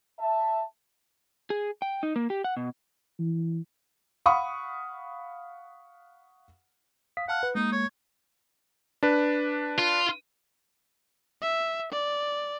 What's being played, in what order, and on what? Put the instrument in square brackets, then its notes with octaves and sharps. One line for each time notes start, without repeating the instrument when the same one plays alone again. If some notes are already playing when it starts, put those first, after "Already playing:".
[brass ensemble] E5 A5
[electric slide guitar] G#4
G5
D#4
A#3
G4
F#5
B2
[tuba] E3
[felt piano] F5 F#5 B5 C#6 D#6
[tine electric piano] F5 D#6 B6
[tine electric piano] F5 A5 F6 [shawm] F#5
[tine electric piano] B4
[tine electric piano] G#3 A#3 [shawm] D#4
[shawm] C#5
[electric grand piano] D4 B4
[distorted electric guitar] F4
[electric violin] E5
D5